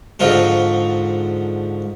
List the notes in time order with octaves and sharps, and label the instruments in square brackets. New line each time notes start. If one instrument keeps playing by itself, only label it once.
[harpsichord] G#2 D3 F3 F4 F#4